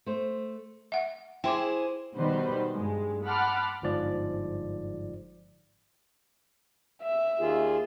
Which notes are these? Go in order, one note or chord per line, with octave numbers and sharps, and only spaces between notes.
A3 C5
E5 F#5
E4 G#4 C5 G5 C6 D6
B2 D#3 G3 B4 C5
G2 G#3
F#5 A5 B5 C6 D6 F6
G1 G#2 F3 D5
E5
D#2 F4 G#4